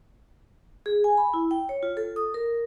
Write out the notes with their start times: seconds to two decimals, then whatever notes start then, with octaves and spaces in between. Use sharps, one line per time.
0.86 G#4
1.04 G#5
1.17 B5
1.34 E4
1.51 G5
1.69 C#5
1.83 F4
1.97 A4
2.16 D#6
2.34 A#4